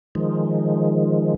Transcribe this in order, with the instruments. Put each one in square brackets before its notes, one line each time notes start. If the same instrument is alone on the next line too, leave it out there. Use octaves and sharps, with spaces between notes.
[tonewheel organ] D#3 F3 G#3